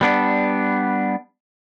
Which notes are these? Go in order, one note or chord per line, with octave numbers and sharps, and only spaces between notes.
G3 B3 D4